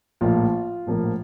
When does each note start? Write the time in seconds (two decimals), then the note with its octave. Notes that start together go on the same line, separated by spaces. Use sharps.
0.21 A#1 A2 F3 A#3 F4
0.87 A#1 A2 F3 A#3